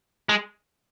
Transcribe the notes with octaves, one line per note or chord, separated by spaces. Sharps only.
G#3